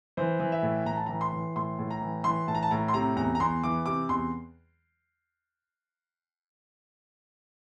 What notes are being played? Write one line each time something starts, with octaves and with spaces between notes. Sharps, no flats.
E3 C5
E3
E5
A2
A2 A#5
A5
E3 A#5
C6
E3
A2 C6
A2
A#5
E3
E3 C6
A2 A5
A#5
A5
A2 A#5
C6
C3 A#5
E2 A#5
A#5
E2 C6
E3 D6
C3 D6
E2 C6